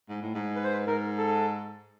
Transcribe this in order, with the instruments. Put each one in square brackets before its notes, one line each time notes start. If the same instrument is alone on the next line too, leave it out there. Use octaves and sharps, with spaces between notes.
[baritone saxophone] G#2
A2
G#2
[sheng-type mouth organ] B4
C5
B4
[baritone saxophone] G#2 [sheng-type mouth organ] A#4
[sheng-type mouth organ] A4